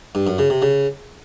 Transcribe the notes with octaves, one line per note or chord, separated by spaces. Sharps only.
G2
F#2
C#3
C3
C#3